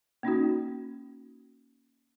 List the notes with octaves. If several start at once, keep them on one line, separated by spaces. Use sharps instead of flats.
A#3 C#4 D#4 F#4